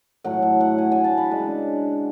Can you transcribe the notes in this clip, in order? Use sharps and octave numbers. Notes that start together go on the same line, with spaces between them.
A2 F#3 A3 F#5
E5
F#5
G#5
G#5
A5
B5
C#3 G#3 D4